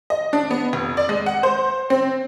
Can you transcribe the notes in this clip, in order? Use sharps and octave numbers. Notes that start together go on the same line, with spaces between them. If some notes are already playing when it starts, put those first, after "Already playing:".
D#5
D4
B3
F1
D5
G#3
F#5
C5
C4